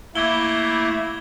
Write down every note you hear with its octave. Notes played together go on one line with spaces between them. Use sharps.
A3 A#3 E4 D6 G#6 G7